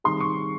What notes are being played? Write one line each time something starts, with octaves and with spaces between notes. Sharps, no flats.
D#3 G3 C4 D#4 G#4 C6
C#6